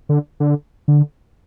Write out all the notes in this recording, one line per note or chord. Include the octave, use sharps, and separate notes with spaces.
D3
D3
D3